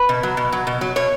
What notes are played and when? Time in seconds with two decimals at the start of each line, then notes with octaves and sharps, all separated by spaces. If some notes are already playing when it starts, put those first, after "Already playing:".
Already playing: B4
0.09 B2
0.23 F#3
0.37 B2
0.52 F#3
0.67 B2
0.81 F#3
0.96 B2 C#5